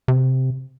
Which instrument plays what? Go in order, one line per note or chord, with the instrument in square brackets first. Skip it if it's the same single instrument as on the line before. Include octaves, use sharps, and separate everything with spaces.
[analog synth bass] C3